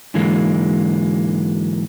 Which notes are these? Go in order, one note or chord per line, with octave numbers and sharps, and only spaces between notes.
G#2 D3 E3 F#3 G#3 A#3